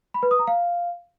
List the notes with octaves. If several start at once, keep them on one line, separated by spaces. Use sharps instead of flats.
B5
B4
D#6
A#5
F5